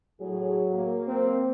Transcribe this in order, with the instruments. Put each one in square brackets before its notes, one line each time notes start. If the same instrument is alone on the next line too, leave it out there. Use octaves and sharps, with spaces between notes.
[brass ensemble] A2 G#4 [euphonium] F#3
[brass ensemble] A#3
[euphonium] C4